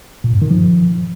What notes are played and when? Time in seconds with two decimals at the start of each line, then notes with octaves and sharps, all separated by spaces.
0.24 A#2
0.33 G2
0.42 D#3
0.50 F3